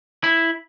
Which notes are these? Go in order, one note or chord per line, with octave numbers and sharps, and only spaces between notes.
E4